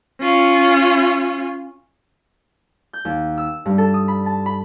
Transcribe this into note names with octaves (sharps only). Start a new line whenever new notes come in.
C#4 F4
G6
D#2
E6
G2
A4
D#6
B5
A5
B5